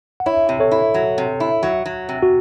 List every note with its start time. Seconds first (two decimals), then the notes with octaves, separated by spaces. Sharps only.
0.20 F#5
0.26 E4 C#5 E5
0.49 C3
0.60 A4 C#5
0.71 E4
0.94 F#3
1.18 C3
1.40 E4
1.63 F#3
1.86 F#3
2.09 C3
2.23 F#4